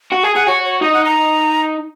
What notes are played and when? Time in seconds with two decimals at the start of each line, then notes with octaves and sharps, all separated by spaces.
0.12 F#4
0.23 G#4 G#5
0.35 G#4 F#5
0.47 F#4 C#5
0.65 C#5
0.82 D#4 D#5
0.94 F#5
1.05 A#5